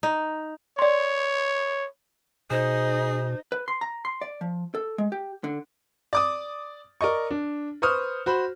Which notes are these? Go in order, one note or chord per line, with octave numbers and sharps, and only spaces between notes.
D#4
C#5 D5 C6
B2 D#4 G#4 C5
B4
C6
A#5
C6
D5
F3
A4
G#3
G4
D3
D5 D6 D#6
A#4 D5 D#5 C#6
D4
B4 C5 C#6 D#6 F6
F#4 C5 B5